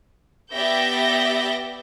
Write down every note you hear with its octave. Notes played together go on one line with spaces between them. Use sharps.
B3 G4 D5 E5 G6 A#6